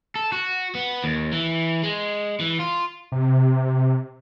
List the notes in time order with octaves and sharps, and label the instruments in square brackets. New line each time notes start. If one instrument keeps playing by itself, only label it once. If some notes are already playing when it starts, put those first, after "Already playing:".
[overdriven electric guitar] A4
F#4
B3
D#2
E3
G#3
E3
F4
[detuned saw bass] C3